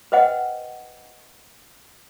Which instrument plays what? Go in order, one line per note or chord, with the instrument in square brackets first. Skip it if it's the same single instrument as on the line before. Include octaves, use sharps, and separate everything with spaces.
[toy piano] B4 C5 D#5 F#5 G5